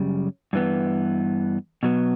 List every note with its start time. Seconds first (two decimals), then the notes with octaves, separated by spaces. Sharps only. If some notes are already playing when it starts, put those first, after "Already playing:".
Already playing: F#2 C#3 G3
0.53 G2 E3 B3
1.83 B2 F#3 B3